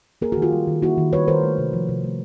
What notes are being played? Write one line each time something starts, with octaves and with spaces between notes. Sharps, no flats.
A#3 G#4 A#4
D#3 F#4 G#4
F4 G4
G3
D#3
A#3 E4 F#4
D#3
G3 B4 C#5
D#3 A#4 C5
A3
C3
F3
C3
A3